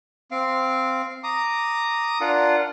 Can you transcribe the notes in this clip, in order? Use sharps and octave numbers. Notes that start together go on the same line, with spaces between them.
C4 F5
A#5 D6 D#6
D4 F4 A#4 F#5